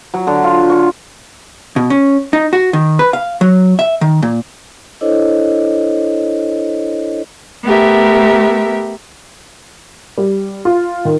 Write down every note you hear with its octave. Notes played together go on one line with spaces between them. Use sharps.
F#3
D3
F4
C#6
B2
C#4
D#4
F#4
D#3
B4
F5
F#3
E5
D#3
A#2
D4 E4 A4 C5 C#5 D#5
A3 B3 G4 A#4 E5
G3
F4
D#3